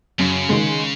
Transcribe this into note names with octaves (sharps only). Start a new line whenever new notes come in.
F#2 C#3
D#3 G#3